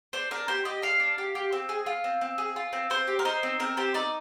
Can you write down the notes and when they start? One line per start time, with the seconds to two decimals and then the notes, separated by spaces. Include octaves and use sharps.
0.13 D4 C5
0.31 D4 A#4
0.48 G4 C5
0.65 G4 D#5
0.82 D4 F5
1.00 D4
1.18 G4
1.35 G4
1.53 C4
1.69 G#4
1.86 F4
2.04 C4
2.21 C4
2.38 G#4
2.56 F4
2.73 C4
2.90 C4 C5
3.07 G4
3.19 A#4
3.25 D#4 C5
3.43 C4
3.60 C4 A#4
3.77 G4 C5
3.94 D#4 D5